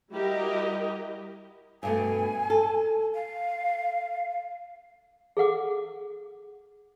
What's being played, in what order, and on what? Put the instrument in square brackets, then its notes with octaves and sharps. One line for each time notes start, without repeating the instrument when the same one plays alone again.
[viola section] G3 E4 F#4 G4 A#4 D#5
[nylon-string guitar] G2 B2 A3 [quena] G#5
[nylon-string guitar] A4
[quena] F5
[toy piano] G#4 A4 F#5 D6